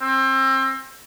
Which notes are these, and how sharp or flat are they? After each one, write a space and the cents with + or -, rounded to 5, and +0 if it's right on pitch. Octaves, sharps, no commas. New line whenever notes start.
C4 +30